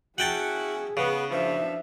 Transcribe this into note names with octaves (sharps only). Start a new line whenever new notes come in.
C#4 E4 F#4 G#4 F#5 G5 A5
C#3 B3
F#2 E3 F3 D4 E5